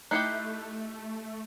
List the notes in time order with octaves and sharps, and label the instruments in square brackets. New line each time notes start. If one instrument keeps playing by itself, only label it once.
[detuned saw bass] A3 [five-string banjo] D#4 E4 G4 [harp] F#6 C7 C#7